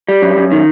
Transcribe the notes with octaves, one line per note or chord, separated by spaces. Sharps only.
G3
F#2
F#2
D#3